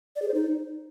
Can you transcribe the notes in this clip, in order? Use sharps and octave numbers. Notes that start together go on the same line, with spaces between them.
D5
G#4
C5
D#4